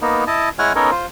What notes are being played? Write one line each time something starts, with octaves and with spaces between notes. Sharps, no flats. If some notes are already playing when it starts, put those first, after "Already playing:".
A#3 B3 D#4
E4 D#5 A5
G#3 E4 C#5 F#5 G#5 F6
B3 C#4 D#4 A4 A#4 C#5
F4 C5